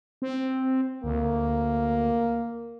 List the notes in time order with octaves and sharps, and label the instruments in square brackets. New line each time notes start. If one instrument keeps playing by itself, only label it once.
[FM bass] C4
[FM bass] D2 [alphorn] A#3